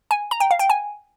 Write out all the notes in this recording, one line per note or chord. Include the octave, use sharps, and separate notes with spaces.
G#5
A#5
G5
F5
G5
G#5